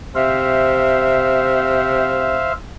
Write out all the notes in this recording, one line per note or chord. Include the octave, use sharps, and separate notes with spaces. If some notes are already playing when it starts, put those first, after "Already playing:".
C3 C5 E5 F5